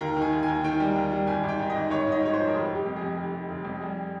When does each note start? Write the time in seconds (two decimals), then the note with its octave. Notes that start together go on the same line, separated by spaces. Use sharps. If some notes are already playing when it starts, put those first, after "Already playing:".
0.01 D#2 A#4
0.17 D#3
0.22 G#5
0.33 D#2
0.43 G#5
0.48 D#2
0.64 D#3 G5
0.80 G3
0.96 D#2
1.12 G3
1.27 G#1 G#5
1.43 G#1
1.49 G5
1.59 G#2
1.70 D#5
1.75 G#1
1.90 G#1 C#5
2.07 G#2 D#5
2.22 G#2 C#5
2.33 F3 C5
2.47 A#4
2.54 F1 G#4
2.70 F1
2.75 G4
2.86 F2
2.96 G#4
3.02 F2
3.17 F1
3.33 F1
3.49 F1
3.65 F2
3.81 G3 G#4